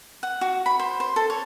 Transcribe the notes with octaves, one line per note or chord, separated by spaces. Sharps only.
F#5
F#4
B5
C5
C5
A4
C#5